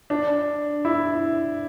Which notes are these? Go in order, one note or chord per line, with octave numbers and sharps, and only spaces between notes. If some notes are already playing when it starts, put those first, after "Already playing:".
D4
E4